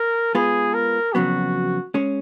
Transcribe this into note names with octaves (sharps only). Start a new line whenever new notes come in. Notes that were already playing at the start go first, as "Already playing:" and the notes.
Already playing: A#4
G#3 B3 F4 G#4 B4
A#4
F2 C#3 F#3 B3 F#4
G#3 C#4 G#4 C#5